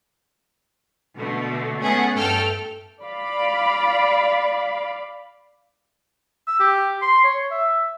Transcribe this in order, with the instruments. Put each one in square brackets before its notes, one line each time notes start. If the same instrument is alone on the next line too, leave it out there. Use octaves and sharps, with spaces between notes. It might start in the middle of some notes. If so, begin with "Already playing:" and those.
[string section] B2 D3 A3
A3 B3 C#4 G#4 F#5
G2 A3 A4 G5 F6
[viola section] D5 F5 B5
[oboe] E6
G4
C6
C#5
E5